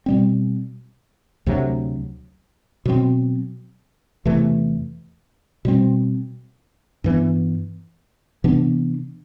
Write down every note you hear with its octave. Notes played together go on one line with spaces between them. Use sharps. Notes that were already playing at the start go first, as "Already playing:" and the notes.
B2 G3 C4
D2 C3 F#3
B2 F#3 C4
E2 C3 E3 A3
B2 G3 C4
G2 E3 B3
C3 E3 B3 D4